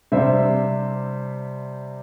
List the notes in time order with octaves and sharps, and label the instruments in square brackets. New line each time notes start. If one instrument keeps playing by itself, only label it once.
[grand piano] C3 G3 D4 C5 E5